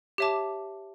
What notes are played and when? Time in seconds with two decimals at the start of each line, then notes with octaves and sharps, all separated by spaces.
0.18 G4 C#5 E5 A5 D6